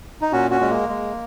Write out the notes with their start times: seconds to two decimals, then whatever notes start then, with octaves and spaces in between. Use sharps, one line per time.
0.21 D#4
0.32 A#2 C#4 F#4
0.51 C#4 F#4
0.61 G#3 C#4
0.70 A#3
0.89 G#3